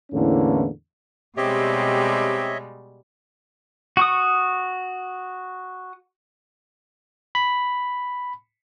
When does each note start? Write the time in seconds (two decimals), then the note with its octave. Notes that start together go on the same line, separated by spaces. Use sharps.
0.12 E2 A2 D3 E3 A#3 C#4
1.37 B2 G3 G#3 C4 G4 C#5 D#5 E5
3.97 F#4 C#6 D#6
7.35 B5